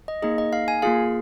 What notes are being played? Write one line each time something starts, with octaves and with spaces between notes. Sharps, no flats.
D#5
A#3 D#4 G#4 D#5
D#5
F5
G#5
A#3 F4 G#4 F5